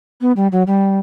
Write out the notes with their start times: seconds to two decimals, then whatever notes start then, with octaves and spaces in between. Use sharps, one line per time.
0.21 B3
0.37 G3
0.52 F#3
0.67 G3